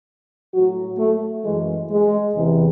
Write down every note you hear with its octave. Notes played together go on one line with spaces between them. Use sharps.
A2 F#3 F#4
A3
F#2 E3 G#3
G#3
E2 C3 E3